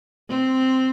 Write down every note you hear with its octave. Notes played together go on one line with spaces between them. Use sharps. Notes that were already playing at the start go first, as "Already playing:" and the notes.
C4